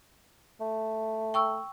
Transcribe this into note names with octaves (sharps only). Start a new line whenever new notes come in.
A3
G5 C#6 E6